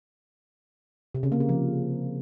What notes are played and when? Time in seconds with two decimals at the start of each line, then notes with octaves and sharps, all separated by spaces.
1.15 C3
1.23 C#3
1.32 A#3
1.40 C#3
1.49 F3